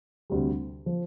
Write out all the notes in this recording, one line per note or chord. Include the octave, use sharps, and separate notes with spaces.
D2 C3 G3
F3